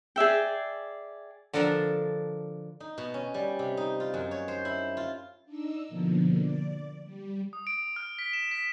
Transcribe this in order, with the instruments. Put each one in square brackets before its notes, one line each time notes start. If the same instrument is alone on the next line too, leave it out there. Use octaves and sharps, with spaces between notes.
[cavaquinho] G#4 D5 E5 G5
[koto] D3 F3 D4 A4 A#4
[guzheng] D#4
B2
C#4
G3
C3
D#4
F4
F#2
C#5
C5
E4
F4
[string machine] D4 D#4 E6
B2 D3 F3 A#3
D5
G3
[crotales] D#6
D7
F6
B6
E7
B6